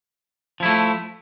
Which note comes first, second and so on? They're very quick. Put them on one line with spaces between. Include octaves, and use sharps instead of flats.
F3 E4 A3